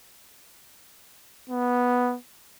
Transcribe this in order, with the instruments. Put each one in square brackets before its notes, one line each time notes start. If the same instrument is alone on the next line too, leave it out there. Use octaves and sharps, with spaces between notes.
[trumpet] B3